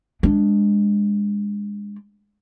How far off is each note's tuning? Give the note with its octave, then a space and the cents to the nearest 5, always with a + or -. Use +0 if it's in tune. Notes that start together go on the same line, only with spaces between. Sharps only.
G#3 -20 D4 +0